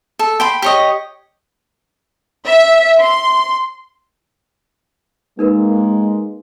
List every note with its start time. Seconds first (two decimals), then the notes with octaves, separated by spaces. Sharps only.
0.19 A4
0.40 G5 B5 C6
0.62 G4 C#5 D#5
2.45 E5
2.98 C6
5.39 G#3 A#3 D#4 A#4 B4